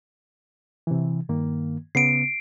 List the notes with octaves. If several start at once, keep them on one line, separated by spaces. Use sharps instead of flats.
C3 E3
G2 D#3 A#3
C#3 B3 C7 D7